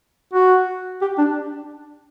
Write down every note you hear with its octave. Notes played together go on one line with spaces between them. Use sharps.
F#4
G4
D4